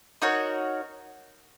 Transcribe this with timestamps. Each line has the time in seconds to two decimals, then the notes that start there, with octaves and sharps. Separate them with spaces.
0.22 D#4 F#4 A#4 C#5